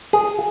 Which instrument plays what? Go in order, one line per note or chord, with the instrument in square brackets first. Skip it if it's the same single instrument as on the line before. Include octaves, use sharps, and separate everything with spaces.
[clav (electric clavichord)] G#4